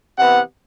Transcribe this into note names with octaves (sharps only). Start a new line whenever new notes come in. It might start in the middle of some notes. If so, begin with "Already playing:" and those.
C3 E3 B3 F#5